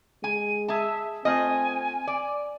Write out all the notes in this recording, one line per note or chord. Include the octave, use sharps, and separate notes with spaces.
G#3 G#5 D#7
G#4 E5 A5
A3 C4 F4 D#5 G#5
D5